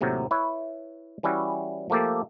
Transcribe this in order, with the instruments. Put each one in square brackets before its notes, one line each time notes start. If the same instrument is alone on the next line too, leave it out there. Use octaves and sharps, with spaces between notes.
[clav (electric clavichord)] D#2 A2 C3 F#3
E4 B4 C#5
E3 G3 C#4 E4 F#4
F3 A3 A#3 G4 A4